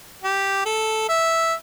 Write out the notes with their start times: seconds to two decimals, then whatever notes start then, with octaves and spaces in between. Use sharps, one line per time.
0.23 G4
0.65 A4
1.09 E5